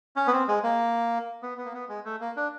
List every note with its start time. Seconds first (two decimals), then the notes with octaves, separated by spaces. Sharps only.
0.16 C#4
0.27 B3
0.33 C4
0.48 G#3
0.63 A#3
1.43 B3
1.58 B3
1.65 A#3
1.74 B3
1.89 G#3
2.05 A3
2.21 A#3
2.37 D4